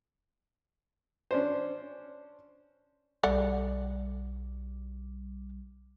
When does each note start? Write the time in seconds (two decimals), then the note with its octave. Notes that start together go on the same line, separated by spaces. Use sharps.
1.31 C#4 D4 C5
3.23 B1 G3 A4 D5 F#5